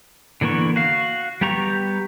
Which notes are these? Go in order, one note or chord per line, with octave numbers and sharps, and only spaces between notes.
D3 E3 A#3 B3 C#6
F#4 F5
G3 B3 G4 A#5 C#6